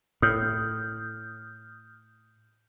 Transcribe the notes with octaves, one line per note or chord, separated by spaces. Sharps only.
A2 D#6 F6 G6